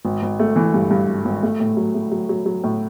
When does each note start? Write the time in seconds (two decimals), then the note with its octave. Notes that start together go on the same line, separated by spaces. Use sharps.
0.05 G#1
0.22 G#1
0.40 A3
0.56 E3
0.74 G2
0.91 G2
1.08 G#1
1.25 G#1
1.43 A3
1.60 A2
1.77 F#3
1.94 A3
2.12 F#3
2.29 F#3
2.46 F#3
2.64 A2